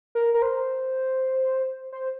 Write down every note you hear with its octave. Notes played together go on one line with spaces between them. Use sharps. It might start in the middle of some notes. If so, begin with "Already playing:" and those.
A#4
A#4
C5
C5